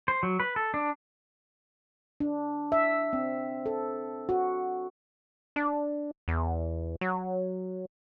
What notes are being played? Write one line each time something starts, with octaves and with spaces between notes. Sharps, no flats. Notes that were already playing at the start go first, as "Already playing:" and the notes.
C5
F#3
B4
A4
D4
D4
E5
C4
A4
F#4
D4
E2
F#3